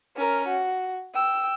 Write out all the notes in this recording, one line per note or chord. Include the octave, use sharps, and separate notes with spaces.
C#4 A#4
F#4
G5 E6